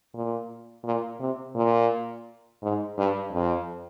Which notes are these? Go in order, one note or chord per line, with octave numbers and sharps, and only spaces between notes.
A#2
A#2
C3
A#2
G#2
G2
F2